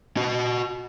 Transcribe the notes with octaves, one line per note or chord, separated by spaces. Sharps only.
F#4 D#5